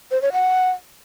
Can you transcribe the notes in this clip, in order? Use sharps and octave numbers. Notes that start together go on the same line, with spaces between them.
C5
C#5
F#5